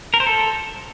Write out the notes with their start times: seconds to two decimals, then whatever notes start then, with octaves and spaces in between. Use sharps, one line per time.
0.14 A#4
0.20 C5
0.27 A4